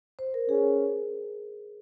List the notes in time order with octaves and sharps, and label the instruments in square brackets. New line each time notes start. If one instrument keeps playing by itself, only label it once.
[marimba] C5
A#4
[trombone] C#4 [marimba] G#4